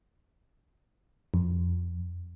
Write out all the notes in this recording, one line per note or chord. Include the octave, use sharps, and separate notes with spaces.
F2